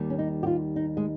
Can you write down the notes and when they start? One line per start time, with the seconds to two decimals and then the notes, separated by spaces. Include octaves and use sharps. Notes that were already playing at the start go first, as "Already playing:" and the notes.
Already playing: D#2 D#3 G3
0.10 C#4
0.19 D#4
0.43 G4
0.47 F4
0.76 D#4
0.97 G#3